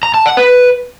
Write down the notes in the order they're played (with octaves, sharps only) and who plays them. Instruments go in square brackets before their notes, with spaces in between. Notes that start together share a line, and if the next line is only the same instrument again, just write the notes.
[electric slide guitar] A#5
A5
F#5
B4